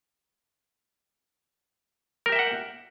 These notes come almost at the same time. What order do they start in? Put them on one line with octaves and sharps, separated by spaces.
A#4 G4 E5 G5 F#5